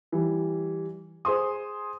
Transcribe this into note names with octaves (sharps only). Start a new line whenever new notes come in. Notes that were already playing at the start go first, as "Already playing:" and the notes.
E3 G3
G#4 C5 C6 D#6